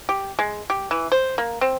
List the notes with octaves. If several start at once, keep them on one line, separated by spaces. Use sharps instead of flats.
G4
G#3
G4
E3
C5
A#3
C4